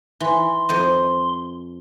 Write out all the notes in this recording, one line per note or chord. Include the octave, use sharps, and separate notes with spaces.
E3 C6
F2 C5 D#5